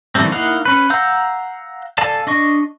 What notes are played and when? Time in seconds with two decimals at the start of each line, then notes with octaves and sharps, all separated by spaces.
0.15 D#3 E3 G3 A3 C4
0.32 A#3 D#4 E4 F5 F#5
0.65 C#4 B4
0.90 F5 F#5 A#5 E6 G6
1.98 A4 D5 F5 G#5 A5
2.27 D4 D#5 C#6